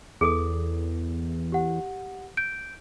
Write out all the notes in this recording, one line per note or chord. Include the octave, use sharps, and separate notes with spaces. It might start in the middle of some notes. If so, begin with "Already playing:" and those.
E2 G#4 A4 D#6
G4 F#5
G6 D7